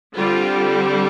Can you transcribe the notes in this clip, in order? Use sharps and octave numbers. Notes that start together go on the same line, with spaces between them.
D3 G3 C4 F4